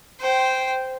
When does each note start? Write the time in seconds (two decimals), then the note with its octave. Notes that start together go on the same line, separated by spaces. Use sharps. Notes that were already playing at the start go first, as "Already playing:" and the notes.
0.20 C5 G5